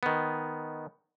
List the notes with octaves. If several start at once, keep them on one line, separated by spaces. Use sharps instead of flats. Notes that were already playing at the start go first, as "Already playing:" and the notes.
D#3 B3